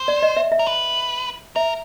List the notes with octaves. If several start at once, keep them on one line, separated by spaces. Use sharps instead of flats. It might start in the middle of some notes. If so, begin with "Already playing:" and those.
Already playing: C5
D5
D#5
E5
E5
A#4
B4
A#4 E5